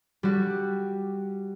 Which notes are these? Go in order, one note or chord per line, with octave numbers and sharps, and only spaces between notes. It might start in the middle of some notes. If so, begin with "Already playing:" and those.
G3 F#4